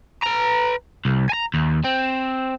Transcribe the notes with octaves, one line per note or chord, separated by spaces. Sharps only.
B4 A#5
C2
G#5 A#5
D#2
C4